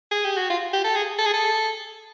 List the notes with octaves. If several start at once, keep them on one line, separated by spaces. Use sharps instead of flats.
G#4
G4
F#4
F4
G4
A4
G#4
A4
G#4
A4